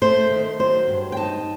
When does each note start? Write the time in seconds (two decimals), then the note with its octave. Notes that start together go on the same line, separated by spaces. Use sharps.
0.01 A3 C5
0.31 D#3
0.59 F#3 C5
0.88 G2
1.12 G5
1.16 D#4 A5